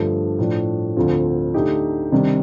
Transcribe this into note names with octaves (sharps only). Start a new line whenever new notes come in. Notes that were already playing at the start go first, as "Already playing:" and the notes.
Already playing: G2 D3 F3 A3
A2 F3 A3 D4
D2 D3 F3 C4 F4
D3 A3 D#4 G4
C3 D#3 G3 D4